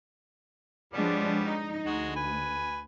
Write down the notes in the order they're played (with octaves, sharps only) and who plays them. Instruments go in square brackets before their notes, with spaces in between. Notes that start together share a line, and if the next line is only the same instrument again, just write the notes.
[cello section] F3 G#3 D4 [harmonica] G3 B3 C#4
[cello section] D#4
[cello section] D2 [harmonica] G#3 F#4
[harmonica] B4 G#5